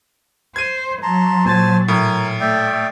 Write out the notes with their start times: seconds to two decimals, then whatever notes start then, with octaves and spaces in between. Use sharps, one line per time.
0.56 C5 G#6 D#7
1.03 F#3 A5 A#5 C6
1.45 A#2 C5 G#5 A5 A6
1.88 A2 A#4 G#5
2.40 A3 D5 E5 G5